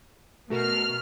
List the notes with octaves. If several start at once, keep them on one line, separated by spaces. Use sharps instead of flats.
B2 A3 F#4 A#4 F6